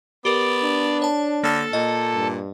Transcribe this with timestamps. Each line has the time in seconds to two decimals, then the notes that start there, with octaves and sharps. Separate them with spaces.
0.25 B3 G4 A#4 D5
0.63 D4
1.02 C#5 A5
1.43 D3 A#3 A4 A5 A6
1.73 A#2 D#5
2.14 G2